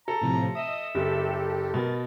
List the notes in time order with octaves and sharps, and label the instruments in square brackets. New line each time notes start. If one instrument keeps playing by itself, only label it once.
[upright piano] A4 [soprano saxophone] A#5
[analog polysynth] A2 C3 F3
[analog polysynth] D#5 D#6 [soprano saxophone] E5
[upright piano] F#1 [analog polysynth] G4 A4
[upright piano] B2 [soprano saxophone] A#4 [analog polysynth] A6